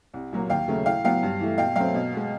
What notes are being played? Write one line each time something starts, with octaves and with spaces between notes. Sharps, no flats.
C2
A#2 F#3 A#3
D#2 F5 G5
C#3 F#3 A3
A2 F5 G5
F#3 B3 F5 G5
G2
E3 A3
B2 F5 G5
F#3 A3 C4 F5 G5
B2
G#3 B3